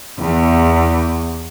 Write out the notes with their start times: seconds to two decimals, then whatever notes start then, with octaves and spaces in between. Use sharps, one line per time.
0.19 E2